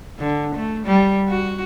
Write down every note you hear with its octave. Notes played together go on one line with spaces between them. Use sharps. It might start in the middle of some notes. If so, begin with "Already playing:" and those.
D3
A3
G3
F#4